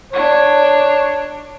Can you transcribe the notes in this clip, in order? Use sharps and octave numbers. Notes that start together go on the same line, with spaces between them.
D4 C#5